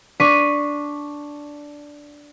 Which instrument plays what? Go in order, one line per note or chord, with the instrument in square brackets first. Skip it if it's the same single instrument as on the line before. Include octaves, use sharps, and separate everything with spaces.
[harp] D4 C#6 B6 D#7